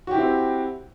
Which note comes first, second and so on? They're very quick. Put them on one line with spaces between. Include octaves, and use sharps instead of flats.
F#4 G4 E4 C4